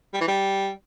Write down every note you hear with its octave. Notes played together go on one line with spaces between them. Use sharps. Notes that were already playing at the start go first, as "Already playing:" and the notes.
G3
E3
G3